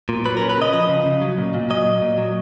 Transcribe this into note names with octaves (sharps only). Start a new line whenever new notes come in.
A#2
F#3 B4
C#4 A#4
B4
C#3 D#5
F3 D#5
C#3
C#3
F#3
A#2
A#2
F#3 D#5
A#2
A#2
F#3